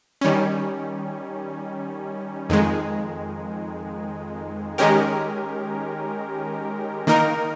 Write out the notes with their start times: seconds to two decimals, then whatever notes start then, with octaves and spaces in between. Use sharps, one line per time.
0.21 D#3 G3 C#4
2.49 F2 D#3 G#3
4.78 D#3 G#3 C#4 G4 A#4
7.07 D#3 A#3 D#4 A#4